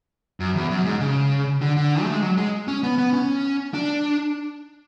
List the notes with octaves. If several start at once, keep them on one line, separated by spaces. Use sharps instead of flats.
F#2
E2
F#2
G#2
C#3
D3
D3
A3
G#3
F#3
G#3
C#4
B3
B3
C#4
D4